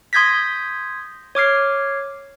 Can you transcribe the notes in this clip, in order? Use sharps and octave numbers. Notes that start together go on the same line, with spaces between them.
C6 D#6 G6 G#6 A#6 B6
C#5 D6 F6 C7